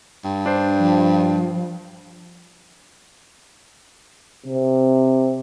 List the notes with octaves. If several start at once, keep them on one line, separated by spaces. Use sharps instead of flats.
G2
D4 C5
F3
C3